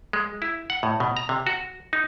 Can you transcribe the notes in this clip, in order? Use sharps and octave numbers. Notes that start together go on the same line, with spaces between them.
G#3
E4
F#5
A2
B2
A#5
C3
F#4
D#4